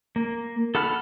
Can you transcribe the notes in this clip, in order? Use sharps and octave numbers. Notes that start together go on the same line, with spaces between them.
A#3
A4 F#5 B5 F6